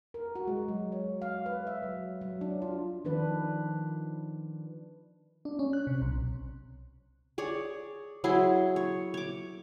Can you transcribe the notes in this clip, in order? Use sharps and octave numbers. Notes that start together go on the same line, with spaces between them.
A#4
F#4
G#3
F#3
C#5
F5
B4
E5
F#3
F#3
D4
F4
D#3 F3 D4 B4
D4
C#4
F#6
C3
B1
G#4 C#5 D5
F#3 E4 G#4 C6
C#5
C#5 D6